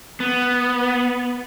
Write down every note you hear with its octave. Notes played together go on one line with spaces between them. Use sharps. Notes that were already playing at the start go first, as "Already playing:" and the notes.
B3